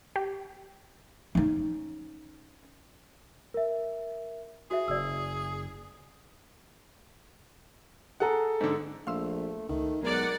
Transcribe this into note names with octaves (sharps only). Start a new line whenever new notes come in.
G4
C#4 D#4
A#4 E5
F#4 G#4 C5 E5
F#1 D5 E6
G#4 A4 F#5 A#5
G#2 D3
A#1 A3 F5 C6 E6
C#2 D#3 A3
B1 G#3 A#4 D5 F#5